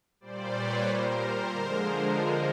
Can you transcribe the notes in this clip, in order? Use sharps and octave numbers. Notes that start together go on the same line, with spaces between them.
A#2 G3 C5 D5
B4 C#5
A#2 G3 A#4 C5
D3 F3 G#3